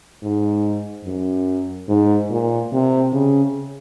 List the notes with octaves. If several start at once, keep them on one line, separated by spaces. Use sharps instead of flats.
G#2
F#2
G#2
A#2
C3
C#3